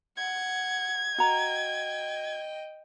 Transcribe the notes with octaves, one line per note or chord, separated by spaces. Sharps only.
F#5 G#6
F#4 D#5 G5 A#5